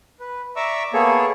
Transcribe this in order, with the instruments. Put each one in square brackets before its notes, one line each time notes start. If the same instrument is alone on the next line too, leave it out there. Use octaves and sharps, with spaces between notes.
[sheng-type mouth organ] B4
D5 E5 A#5 C#6 D6 E6
A#3 B3 G#4 A4 C#5